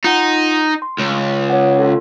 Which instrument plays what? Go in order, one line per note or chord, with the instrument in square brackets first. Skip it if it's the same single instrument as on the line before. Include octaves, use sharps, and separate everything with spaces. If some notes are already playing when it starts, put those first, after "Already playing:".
[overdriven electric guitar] D#4 [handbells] F4 F#5
[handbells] C6
[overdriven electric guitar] C#2
[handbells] C#5 F#5
F4 A4